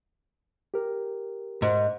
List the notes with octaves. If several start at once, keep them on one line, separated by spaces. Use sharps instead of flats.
G4 A#4
G#2